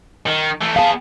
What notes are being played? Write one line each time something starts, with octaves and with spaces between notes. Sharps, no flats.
D#3
E3 A3
B3 G#4 F5 A5